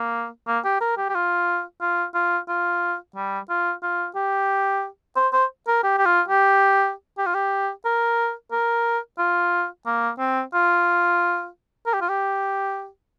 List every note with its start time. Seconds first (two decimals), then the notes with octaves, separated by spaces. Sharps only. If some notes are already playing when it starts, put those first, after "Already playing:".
Already playing: A#3
0.47 A#3
0.65 G4
0.81 A#4
0.97 G4
1.09 G4
1.15 F4
1.81 F4
2.15 F4
2.48 F4
3.16 G3
3.49 F4
3.83 F4
4.15 G4
5.16 C5
5.33 C5
5.67 A#4
5.83 G4
5.98 G4
6.06 F4
6.28 G4
7.18 G4
7.26 F4
7.34 G4
7.85 A#4
8.52 A#4
9.18 F4
9.86 A#3
10.19 C4
10.53 F4
11.86 A#4
11.94 G4
12.01 F4
12.09 G4